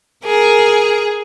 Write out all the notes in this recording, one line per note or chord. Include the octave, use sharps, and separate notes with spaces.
G#4 A#4